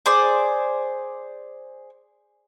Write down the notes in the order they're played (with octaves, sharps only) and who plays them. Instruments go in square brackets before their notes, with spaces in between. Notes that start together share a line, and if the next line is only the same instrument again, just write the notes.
[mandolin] G#4 C5 D5